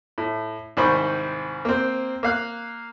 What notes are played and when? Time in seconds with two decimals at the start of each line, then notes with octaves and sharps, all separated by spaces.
0.18 A2
0.77 C2 G#2 D#3 C5 B5 C#6
1.65 A#3 C4
2.23 A#3 F5 F#6